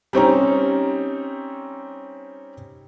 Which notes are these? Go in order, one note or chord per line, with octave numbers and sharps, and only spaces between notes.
G3 C4 C#4 D#4